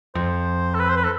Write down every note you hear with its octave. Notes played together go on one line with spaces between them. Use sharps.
F2 C5
A4
B4
C5
B4
A4